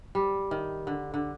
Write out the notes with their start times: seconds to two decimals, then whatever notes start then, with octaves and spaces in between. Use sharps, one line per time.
0.15 G3
0.51 D#3
0.87 D3
1.14 D3